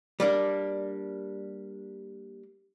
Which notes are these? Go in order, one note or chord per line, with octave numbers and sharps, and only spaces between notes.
G3 A#3 D4